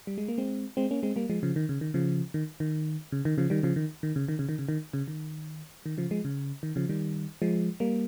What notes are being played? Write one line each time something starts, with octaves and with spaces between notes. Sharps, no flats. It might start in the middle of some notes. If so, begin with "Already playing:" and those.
G3
G#3
A#3
G#3 C4
G#3 C4
A#3 C#4
G#3 C4
G3 A#3
F3 G#3
C#3 F3
D#3
C#3
D#3
C#3 F3
D#3
D#3
C#3
D#3
C#3 F3
D#3 G3
C#3 F3
D#3
D#3
C#3
D#3
C#3
D#3
C#3
D#3
C#3
D#3
D#3
C#3 F3
F3 G#3
C#3
D#3
C#3 F3
D#3 G3
F3 G#3
G3 A#3